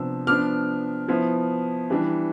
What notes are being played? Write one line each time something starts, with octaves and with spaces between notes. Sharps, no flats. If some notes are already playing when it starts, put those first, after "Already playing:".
Already playing: C3 F3 B3 D4 E6
F3 B3 D4 D6 F6
F3 B3 E4
E3 G3 D4